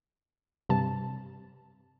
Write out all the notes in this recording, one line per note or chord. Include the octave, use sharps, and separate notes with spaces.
G2 C3 A5